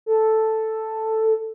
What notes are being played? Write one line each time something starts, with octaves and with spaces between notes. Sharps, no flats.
A4